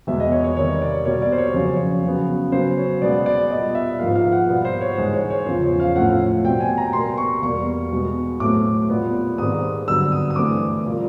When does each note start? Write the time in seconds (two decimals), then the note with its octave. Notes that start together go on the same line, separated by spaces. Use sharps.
0.07 E2 B2 G#3 B3 E5
0.20 D#5
0.32 C#5
0.44 C#5
0.57 C3 D#3 G3 C4 C#5
0.82 D5
1.05 B2 G3 A#3 C#5
1.22 D5
1.32 C5
1.38 C#5
1.54 F2 C#3 F#3 C#5
2.03 C#3 F#3 B3
2.52 C#3 F#3 B3 C5
2.77 C#5
3.01 B2 G#3 B3 D5
3.26 D5
3.50 A#2 G3 B3 D#5
3.75 E5
3.99 G#2 F3 A#3 F5
4.16 F5
4.32 F#5
4.49 B2 G3 B3 F#5
4.65 C5
4.81 C#5
4.98 G#2 E3 G#3 C5
5.14 C#5
5.30 C#5
5.46 E2 C#3 F3 C5
5.63 C#5
5.80 F5
5.96 A2 F3 A3 C4 F#5
6.44 B2 G3 C4 G5
6.60 G#5
6.78 A#5
6.93 B2 G3 A#3 C6
7.18 C#6
7.42 E2 B2 G3 A#3 C#6
7.91 B2 G#3 B3
8.40 A2 F#3 A3 C4 D6
8.89 A#2 G3 B3
9.38 G#2 D#3 G3 C4 D#6
9.87 G2 D3 F#3 B3 E6
10.12 D#6
10.30 D#6
10.36 G2 E3 A3 C4 D6
10.86 A#2 G3 A#3